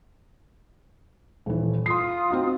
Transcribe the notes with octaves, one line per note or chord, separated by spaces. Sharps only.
D#1 E3
F4 C6 D#6 C7
C4 D#4 F#4